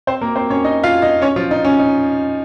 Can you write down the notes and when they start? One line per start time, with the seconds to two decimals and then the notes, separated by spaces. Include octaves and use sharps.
0.07 C4 C5
0.21 A#3 A#4
0.36 C4 C5
0.50 C#4 C#5
0.64 D#4 D#5
0.84 F4 F5
1.02 D#4 D#5
1.22 C#4 C#5
1.36 F3 F4
1.51 D#4
1.65 C#4
1.79 D#4